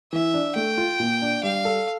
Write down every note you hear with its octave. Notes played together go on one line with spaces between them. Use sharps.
E3 E5
D4
A3 G5
F4
A#2
D4
G3 F5
A4